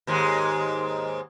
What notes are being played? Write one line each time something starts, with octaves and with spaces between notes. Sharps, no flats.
D#2 G#2 G#3